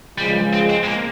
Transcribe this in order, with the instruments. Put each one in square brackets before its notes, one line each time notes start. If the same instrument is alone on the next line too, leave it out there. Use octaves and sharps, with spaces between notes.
[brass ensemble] C#2 C#3 F3 G#3 [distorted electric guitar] G3
[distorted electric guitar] C4
C4
G#3
A#3